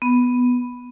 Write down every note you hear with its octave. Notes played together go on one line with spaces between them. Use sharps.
B3